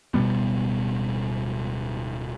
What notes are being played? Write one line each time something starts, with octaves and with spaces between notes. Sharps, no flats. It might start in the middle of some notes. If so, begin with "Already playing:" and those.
D1 B2 G3 B3